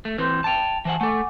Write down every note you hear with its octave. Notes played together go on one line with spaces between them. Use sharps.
A3
E3 C4 B4 C6 G6
G5 A5 A6 F7
E3 C5 F#5 G#5 A5
A3 A4 F#5 G#5 D6